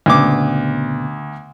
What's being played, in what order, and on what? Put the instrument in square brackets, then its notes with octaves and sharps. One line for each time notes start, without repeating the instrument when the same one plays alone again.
[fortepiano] D2 D6 [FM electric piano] A#2 C#3 B3